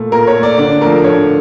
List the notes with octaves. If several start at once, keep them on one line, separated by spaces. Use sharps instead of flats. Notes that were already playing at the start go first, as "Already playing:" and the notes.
Already playing: A#2 A3
A#2 A#4
C#5
A3
D5
D3 D5
F3 A3 A#4
D3 C#5